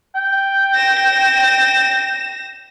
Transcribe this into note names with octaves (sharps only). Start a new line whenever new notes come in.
G5
A#6 E7